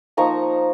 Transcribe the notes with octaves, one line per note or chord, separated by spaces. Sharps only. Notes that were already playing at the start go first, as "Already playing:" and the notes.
F3 A#3 D#4 A#5 C#6